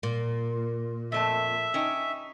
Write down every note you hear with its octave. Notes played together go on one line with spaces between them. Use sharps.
A#2
F2 A3 E5 A5
C#4 D#4 G5